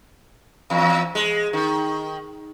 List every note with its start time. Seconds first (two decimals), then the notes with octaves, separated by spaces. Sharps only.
0.70 E2
1.15 G#3
1.53 D#3